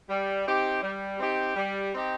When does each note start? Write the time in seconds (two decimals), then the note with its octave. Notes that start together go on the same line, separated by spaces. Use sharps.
0.10 G3
0.46 C4 D#4 G4
0.83 G3
1.20 C4 D#4 G4
1.56 G3
1.93 C4 D#4 G4